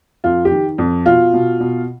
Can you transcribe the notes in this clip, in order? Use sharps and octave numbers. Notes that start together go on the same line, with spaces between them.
F2 F4
G4
D#3
F2
B2 F4
B2
B2